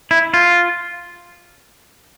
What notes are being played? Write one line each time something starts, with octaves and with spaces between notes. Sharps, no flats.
E4
F4